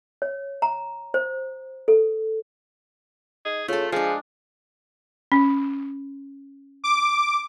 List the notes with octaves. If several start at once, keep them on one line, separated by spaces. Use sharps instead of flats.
C#5
A#5
C5
A4
D#4 G#4
C#3 A3 F4 A4
F3 G#3 D4 G#4
C#4
D6